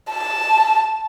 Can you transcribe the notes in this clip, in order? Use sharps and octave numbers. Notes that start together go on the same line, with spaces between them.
A5